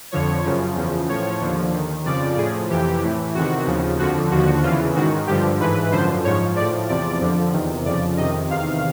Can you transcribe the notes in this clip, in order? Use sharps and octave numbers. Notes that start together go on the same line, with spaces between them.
F2 D3 F3 C#5
F#2 C#3 F3
E2 C#3 F3
A2 F3 C#5
D#2 D3 F3
D#2 D#3
F2 C#3 F3 D5
A2 F3 G#4
F2 C3 E3 G4
A2 E3
E2 C3 D#3 F#4
D#2 C#3 F3
F2 D3 F3 F#4
D#2 D3 F3 F#4
E2 C#3 E3 F4
G#2 D#3 F#4
G2 D3 F3 G4
G#2 E3 B4
F#2 D3 F3 C5
G#2 F3 C#5
A2 F3 D5
E2 C3 F3 D5
F2 D3 F3
E2 C3 D#3
F2 C#3 F3 D5
F2 C3 D#3 D#5
E2 C3 D#3 F5